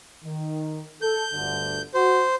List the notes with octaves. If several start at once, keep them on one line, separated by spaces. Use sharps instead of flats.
D#3
A4 G6
G1 D2 D3
F#4 C5